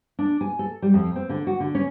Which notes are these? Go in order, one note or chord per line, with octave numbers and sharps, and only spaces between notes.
D4
G#5
A4
G3
F2
C4
D3
F#4
D3
C#4